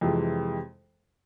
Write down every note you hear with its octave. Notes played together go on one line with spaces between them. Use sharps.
F2 C3 E3 G#3